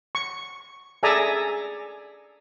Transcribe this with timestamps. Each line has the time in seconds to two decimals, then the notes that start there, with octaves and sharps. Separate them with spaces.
0.15 C#6
1.03 G#4 A4 D5 E5 G#5 A#5